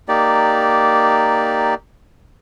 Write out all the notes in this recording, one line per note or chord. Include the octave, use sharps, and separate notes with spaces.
A#3 D#4 G4 D5